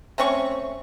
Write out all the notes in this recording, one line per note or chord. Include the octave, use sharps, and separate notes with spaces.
A3 C4 C#4 C#6